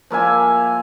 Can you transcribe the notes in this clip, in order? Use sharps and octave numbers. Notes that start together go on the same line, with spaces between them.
F3 A#3 E5 G#5